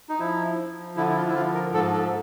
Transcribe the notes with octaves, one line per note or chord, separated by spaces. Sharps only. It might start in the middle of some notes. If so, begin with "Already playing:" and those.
D#4
F3 E4
F3
D3 E4
E4
F4
E4
F3 F4
A#4
G#2 A4
A4